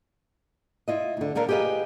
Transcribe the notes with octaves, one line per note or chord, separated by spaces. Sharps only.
E4 F4 D#5
D2 D3
A#2 D3 D4 A#4 F5
G4 G#4 B4 C#5 D#5 F5